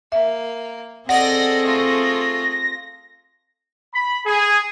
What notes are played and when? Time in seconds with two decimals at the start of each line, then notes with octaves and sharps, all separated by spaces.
0.12 A#3 E5
1.09 C4 G#4 A4 D5 D#5 F#5 A#6
1.65 A3 F4
3.94 B5
4.26 G#4